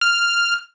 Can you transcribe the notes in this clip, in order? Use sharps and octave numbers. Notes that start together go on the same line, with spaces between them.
F6